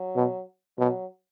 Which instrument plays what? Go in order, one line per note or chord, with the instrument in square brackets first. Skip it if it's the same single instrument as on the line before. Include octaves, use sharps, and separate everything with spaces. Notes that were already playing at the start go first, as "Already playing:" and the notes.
Already playing: [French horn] F#3
[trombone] B2
[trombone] B2 [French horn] F#3